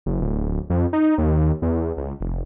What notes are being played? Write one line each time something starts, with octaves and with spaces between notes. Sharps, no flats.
F#1
D1
F2
D#4
D#2
E2
C#2
F1